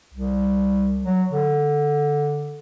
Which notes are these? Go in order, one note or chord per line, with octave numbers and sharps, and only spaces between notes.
C2
F#3
D3